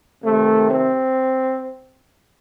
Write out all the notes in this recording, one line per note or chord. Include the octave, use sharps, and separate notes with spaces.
C3 D#3 A3
C4